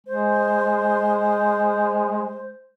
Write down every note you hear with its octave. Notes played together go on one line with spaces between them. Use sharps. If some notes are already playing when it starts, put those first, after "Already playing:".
G#3 C5